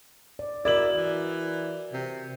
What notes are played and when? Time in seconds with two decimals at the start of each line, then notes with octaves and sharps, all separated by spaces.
0.39 D5
0.65 E4 F#4 A#4 D5 D#5 F#7
0.96 E3
1.93 C3